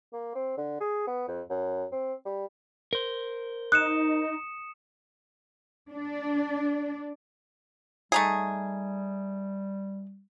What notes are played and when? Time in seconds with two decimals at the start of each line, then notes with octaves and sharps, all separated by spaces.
0.13 A#3
0.35 C4
0.57 D3
0.80 G#4
1.07 B3
1.28 F2
1.50 F#2
1.92 C4
2.25 G3
2.93 A#4 C5
3.72 D#4 D#6 F#6 C#7 E7
5.91 D4 D5
8.12 G3 A3 D#4 G#4